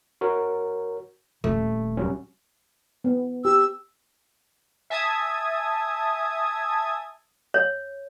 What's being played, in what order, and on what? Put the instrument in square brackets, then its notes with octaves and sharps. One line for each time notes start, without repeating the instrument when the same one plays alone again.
[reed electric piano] F#4 A#4 C#5
[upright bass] D#1 [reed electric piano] A3
[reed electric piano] F#3 G3 C#4
[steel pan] B3
[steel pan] G4 [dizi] E6
[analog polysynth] E5 G#5 A5 D#6 G#6
[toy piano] C#5